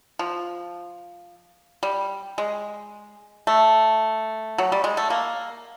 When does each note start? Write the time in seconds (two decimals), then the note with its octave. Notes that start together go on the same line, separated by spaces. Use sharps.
0.19 F3
1.83 G3
2.38 G#3
3.47 A3
4.58 F#3
4.72 G3
4.84 G#3
4.97 A3
5.10 A#3